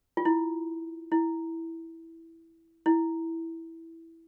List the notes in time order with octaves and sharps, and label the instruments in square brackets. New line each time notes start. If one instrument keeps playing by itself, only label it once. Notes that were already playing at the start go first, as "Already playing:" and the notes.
[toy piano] F4
E4
E4
E4